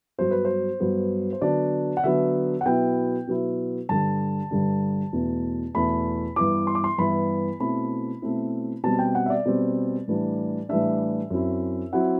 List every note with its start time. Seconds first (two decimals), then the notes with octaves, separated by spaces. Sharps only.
0.18 G2 F#3 B3 C5
0.31 B4
0.45 C5
0.80 G2 F#3 B3
1.33 C5
1.42 D3 F#3 B3 D4 D5
1.97 F#5
2.03 D3 F#3 B3 D4 E5
2.61 F#5
2.66 B2 F#3 B3 E4 G5
3.27 B2 F#3 B3 E4
3.89 G2 D3 G3 A5
4.51 G2 D3 G3
5.13 E2 B2 A3
5.74 E2 B2 A3 B5
6.36 G2 E3 B3 E4 D6
6.67 C6
6.75 D6
6.84 C6
6.98 G2 E3 B3 E4 B5
7.60 B2 A3 C4 E4 B5
8.22 B2 A3 C4 E4
8.84 B2 G3 C4 A5
8.99 G5
9.15 F#5
9.26 E5
9.30 D5
9.45 B2 G3 C4
10.08 A2 E3 G3 D4
10.69 A2 E3 G3 D4 E5
11.30 F#2 F#3 C4 E4
11.93 F#3 C4 E4 F#5